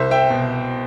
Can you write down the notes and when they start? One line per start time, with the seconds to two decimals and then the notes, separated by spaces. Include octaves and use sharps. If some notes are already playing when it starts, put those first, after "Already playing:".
Already playing: C2 C5 E5
0.11 E5 G5
0.30 B2